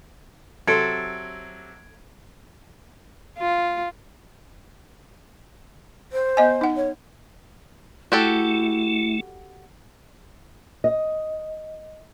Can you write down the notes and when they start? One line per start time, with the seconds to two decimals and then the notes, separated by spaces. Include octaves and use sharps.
0.67 C3 F#3 A4 C6 G#6 D7
3.39 F4
6.12 C5
6.37 B3 D#5 G#5
6.61 D#4 F#5
6.76 C#5
8.12 A3 E4 F#4 G4 A4
10.84 D#5